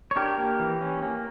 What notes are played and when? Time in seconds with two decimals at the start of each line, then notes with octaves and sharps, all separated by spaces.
0.11 C#5
0.16 D4 G4 A#4
0.38 A#3
0.60 E3
0.81 C#4
1.02 A#3